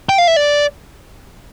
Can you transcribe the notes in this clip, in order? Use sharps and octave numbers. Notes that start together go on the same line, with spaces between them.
G5
F5
E5
D5